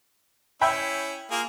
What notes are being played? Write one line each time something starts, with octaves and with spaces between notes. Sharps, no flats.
C#4 E4 E5 G5 B5
A#3 F4 G#4